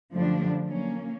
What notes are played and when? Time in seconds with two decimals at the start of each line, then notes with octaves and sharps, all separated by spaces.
0.12 F#2 D3 F3 G3 A3 D4
0.66 F#3 A#3 C#4